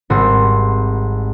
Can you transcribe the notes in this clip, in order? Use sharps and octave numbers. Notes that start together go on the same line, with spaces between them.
G#1 G3 F#4 C6